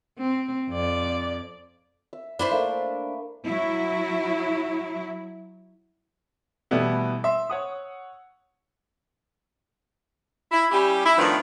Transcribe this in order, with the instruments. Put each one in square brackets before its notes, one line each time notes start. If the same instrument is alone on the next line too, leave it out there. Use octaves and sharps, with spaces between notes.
[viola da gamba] C4
F2 D5
[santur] E5
[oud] D4 E4 C5 [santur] B4
[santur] A3 A#3
[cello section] F#3 E4
[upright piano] B2 E3 G3 A3 B3 E4
E5 C6
C#5 F#5 D#6
[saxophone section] E4
G3 C#4 E4 G4
E4
A2 D#3 F3 B3 D4 F4